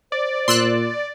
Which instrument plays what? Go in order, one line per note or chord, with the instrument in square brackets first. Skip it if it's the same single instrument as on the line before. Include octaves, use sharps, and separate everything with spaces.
[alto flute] C5 [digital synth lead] D5
[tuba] A#2 [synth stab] C6 E6 F#6